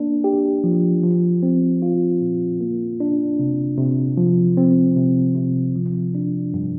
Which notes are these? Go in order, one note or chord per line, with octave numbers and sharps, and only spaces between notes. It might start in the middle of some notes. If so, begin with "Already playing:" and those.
Already playing: A#3 D4
G4
F3
F3
C4
F4
A#2
A#3
D4
C3
C3
F3
C4
C3
C3
F3
D4
G2